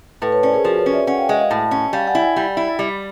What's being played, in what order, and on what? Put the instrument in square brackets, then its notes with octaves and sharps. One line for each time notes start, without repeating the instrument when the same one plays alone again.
[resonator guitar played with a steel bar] A2 [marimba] A4 B4
[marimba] B4 C#5
[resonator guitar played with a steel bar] C#4 [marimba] C5 D5
[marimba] G#4 A#4
[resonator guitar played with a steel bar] F3 [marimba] F#4 G#4
[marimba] B4 C#5
[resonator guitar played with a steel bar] C#4
[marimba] D5 E5
[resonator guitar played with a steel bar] C#4 [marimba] F#5 G#5
[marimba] F5 G5
[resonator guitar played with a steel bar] G#3 [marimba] E5 F#5
[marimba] D#5 F5
[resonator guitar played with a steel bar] A2
C#4
[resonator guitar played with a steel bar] G3 [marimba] F5 G5
[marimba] F#5 G#5
[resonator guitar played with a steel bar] E4
[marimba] F#5 G#5
[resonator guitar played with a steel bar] G3
E4
G3